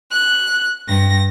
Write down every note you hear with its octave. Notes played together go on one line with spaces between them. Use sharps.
F#6
G2 A#6